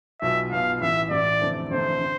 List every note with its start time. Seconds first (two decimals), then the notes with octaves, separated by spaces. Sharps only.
0.21 B1 B2 B3 F4 E5
0.52 B1 B2 B3 F4 F5
0.81 A1 A2 E3 E5
1.10 A1 A2 E3 D5
1.41 F1 E2 D3 A3 C4
1.71 F1 E2 D3 A3 C4 C5
2.00 D3